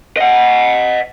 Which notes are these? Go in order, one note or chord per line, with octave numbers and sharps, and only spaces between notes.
D#5 F#5